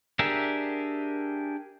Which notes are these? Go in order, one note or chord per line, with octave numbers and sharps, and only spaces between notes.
D4 G4 G#4 A#4 E5